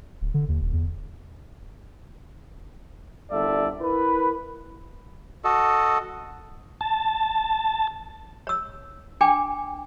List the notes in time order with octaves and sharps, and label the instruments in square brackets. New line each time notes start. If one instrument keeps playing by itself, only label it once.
[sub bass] D1
D3
D#2
D#1
E2
[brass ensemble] G1 C2 A4 D5 E5
E4 A#4 B4
[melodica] F#4 A4 D#5
[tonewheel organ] A5
[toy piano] C#5 E6
D4 G5 G#5 D6